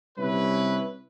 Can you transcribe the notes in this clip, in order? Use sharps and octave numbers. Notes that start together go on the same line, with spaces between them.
C3 G3 C#4 E4 B4